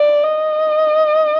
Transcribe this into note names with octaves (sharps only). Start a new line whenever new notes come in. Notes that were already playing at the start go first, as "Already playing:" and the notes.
Already playing: D5
D#5